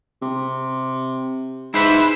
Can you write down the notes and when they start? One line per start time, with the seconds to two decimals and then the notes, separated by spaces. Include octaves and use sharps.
0.22 C3
1.74 G#2 E4 B4 C5 E5